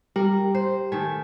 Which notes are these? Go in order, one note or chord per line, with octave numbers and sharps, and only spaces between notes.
G3 G4 A#4
C5
D#3 A3 G#5